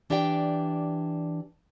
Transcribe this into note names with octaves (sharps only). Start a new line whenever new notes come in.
E3 D4 G4 D5 E5 G5